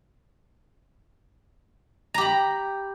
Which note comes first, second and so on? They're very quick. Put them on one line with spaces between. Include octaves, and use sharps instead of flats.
A#5 G4 B5